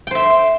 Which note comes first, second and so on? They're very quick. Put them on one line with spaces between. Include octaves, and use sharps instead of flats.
G5 C5 E5